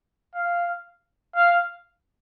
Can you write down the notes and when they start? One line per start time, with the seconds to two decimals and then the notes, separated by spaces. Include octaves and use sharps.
0.35 F5
1.36 F5